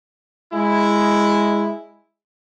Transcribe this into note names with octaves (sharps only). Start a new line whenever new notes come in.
G#3 E4